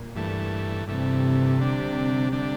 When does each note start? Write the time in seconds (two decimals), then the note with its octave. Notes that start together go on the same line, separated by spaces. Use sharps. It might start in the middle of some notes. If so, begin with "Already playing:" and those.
Already playing: A#2
0.15 G2 E3 A3
0.87 G2 C3 E3 A3
1.60 D3 G3 D4
2.32 D3 G3 D4